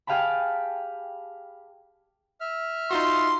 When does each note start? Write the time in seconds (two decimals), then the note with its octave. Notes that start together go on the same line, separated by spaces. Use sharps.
0.07 G4 G#4 F5 G5 A5 B5
2.41 E5 F6
2.91 D#4 F4 F#4 C6